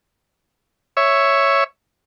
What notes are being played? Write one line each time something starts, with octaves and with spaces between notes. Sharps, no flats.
C#5 E5